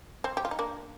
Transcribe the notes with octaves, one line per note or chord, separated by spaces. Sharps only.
C4
G4
F4
D#4
A#3 D4